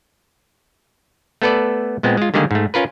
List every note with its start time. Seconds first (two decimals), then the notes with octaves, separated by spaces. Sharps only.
1.42 A3 B3 A4 B4 D5
2.03 A#2 G#3 B3 C4
2.17 G#3 F4
2.34 D3 D#3 G3 G#3 A#3 G#4
2.51 G#2 A3
2.74 C#4 F4 A#4 B4